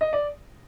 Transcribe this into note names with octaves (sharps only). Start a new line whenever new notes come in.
D#5
D5